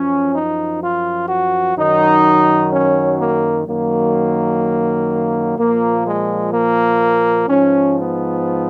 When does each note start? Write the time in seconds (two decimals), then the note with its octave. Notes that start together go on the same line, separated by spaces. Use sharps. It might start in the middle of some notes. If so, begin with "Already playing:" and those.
Already playing: F#2 F3 C#4
0.34 D#4
0.81 F4
1.29 F#4
1.76 F#2 D#3 F#3 D#4
2.71 C#4
3.19 A#3
3.67 F#2 D#3 F#3 A#3
5.57 A#2 F3 A#3
6.06 G#3
6.53 A#3
7.48 G#2 F3 C#4
7.96 B3